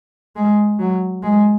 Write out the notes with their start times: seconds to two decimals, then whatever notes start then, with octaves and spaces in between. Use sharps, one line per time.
0.36 G#3
0.80 F#3
1.23 G#3